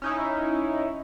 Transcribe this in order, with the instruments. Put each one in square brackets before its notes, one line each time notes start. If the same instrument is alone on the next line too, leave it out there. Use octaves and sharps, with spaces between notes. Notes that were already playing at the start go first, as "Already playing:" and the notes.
[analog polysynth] C#4 D#4 E4